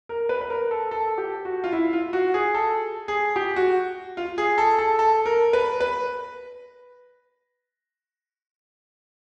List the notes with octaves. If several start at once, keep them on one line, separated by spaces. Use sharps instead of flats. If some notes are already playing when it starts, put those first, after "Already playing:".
A#4
B4
B4
A#4
A4
A4
G4
F#4
F4
E4
F4
F#4
G#4
A4
G#4
G4
F#4
F4
G#4
A4
A4
A4
A#4
B4
B4